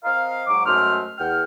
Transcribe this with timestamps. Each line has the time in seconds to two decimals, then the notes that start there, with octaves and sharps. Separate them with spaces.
0.04 C4 A#4 D#5 F5
0.47 G#2 F#3 D6
0.65 F#2 G#3 A3 C5 F6
1.17 E2 F#5 G5 F6